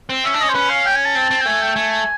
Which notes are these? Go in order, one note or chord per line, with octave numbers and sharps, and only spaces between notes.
C4
C#4 E5
D4
C#4 D#5
C5
C#4 B4
F5
G5
G#5
A5
C4
C4
G5
A3 G#5
G5
A3 G#5
G#5